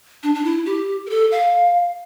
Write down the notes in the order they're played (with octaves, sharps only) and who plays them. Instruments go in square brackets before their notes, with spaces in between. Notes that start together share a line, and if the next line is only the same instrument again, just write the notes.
[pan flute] D4
D4
E4
G4
A#4
A4
F5